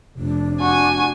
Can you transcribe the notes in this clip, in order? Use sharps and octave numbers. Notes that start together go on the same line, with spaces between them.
F1 D4
F#4 G#5